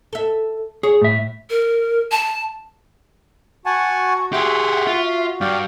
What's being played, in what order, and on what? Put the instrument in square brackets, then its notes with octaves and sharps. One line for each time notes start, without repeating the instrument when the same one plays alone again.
[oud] A4 E5
[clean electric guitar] G#4 [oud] C#5
[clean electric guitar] A2 E5
[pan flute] A#4
A5
[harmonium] F#4 [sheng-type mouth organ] F#5 G#5 A5 [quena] C#6
[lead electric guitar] G4 G#4 [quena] E5 [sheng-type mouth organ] F#5 C6
[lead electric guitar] F4
[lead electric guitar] G2 [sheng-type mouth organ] D5 F5 G5